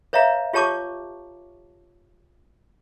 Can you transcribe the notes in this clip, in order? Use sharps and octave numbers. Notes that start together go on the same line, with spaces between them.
B4 C#5 E5 F5 A#5
F4 G4 C#5 A5 C#6 D6